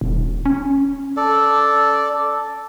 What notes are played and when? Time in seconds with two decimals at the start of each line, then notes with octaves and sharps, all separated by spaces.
0.01 D#1
0.45 C#4
1.17 A4 D5